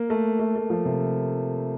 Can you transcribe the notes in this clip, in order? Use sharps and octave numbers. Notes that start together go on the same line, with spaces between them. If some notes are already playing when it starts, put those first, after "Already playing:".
Already playing: A#3
A3
A3
A3
F3
C3